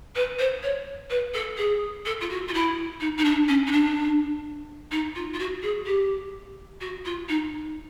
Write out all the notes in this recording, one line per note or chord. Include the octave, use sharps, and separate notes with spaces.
B4
C5
C#5
B4
A4
G#4
A4
F4
F#4
F4
E4
D#4
D#4
D4
C#4
D#4
D4
D#4
F4
F4
F#4
G#4
G4
F#4
F4
D#4